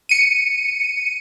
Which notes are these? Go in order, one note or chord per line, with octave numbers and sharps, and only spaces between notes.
C#7 D#7